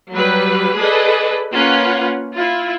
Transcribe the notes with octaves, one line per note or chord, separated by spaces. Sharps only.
F#3 G3 B4
G#4 A4 B4 D5 D#5
A#3 C#4 F4 B4 F#5
E4 F4